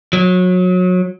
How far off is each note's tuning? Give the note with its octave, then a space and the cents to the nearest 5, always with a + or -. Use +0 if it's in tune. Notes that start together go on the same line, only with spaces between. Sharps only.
F#3 -25